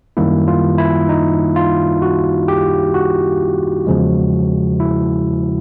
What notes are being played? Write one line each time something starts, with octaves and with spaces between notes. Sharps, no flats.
F#2 D#3 G3 A#3 E4
F4
E4
D#4
F4
F#4
G4
F#4
E2 C#3 F3 G#3
E4